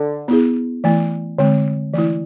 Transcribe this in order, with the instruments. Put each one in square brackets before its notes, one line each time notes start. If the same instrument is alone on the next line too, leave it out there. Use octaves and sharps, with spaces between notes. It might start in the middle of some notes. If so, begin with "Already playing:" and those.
Already playing: [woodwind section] D3
[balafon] B3 E4 G#4
E3 A3 E4
D3 G#3 C4
E3 A3 E4